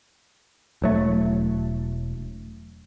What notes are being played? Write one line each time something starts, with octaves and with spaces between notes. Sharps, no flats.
E1 F#3 A3